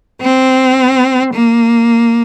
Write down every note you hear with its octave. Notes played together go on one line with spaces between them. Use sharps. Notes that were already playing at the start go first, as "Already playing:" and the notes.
C4
A#3